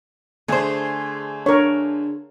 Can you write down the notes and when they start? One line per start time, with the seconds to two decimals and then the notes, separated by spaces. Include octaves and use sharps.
0.48 D3 A3 G#4 C5
1.46 D4 A#4 C#5